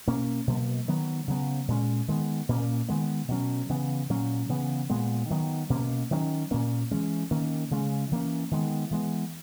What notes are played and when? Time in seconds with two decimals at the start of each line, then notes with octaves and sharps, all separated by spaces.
0.07 B2 A#3 C#4
0.47 B2 F#3 A#3
0.88 D#3 F#3 B3
1.28 C#3 F#3 B3
1.68 A#2 G#3 C#4
2.08 D#3 G#3 B3
2.49 A#2 A#3 C#4
2.89 D#3 G#3 B3
3.28 B2 F#3 C#4
3.69 C#3 E3 B3
4.10 A#2 F#3 C#4
4.49 C#3 E3 B3
4.90 A#2 G#3 B3
5.30 D#3 F#3 B3
5.70 B2 A#3 C#4
6.11 D#3 F#3 A#3 C#4
6.51 A#2 A#3 C#4
6.91 E3 G#3 C#4
7.31 D#3 A#3 C#4
7.71 C#3 G#3 C#4
8.11 E3 A#3 C#4
8.51 D#3 G#3 B3
8.91 E3 G#3 B3